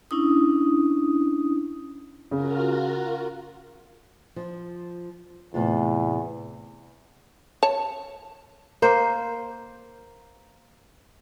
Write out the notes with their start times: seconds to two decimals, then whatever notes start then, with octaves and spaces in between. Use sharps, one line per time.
0.11 C#4 D4 E4 D#6
2.31 C#3 F4 F#4 A#4
4.36 F3
5.54 E2 A2 C3 F4
7.63 C#5 A5
8.82 A#3 C5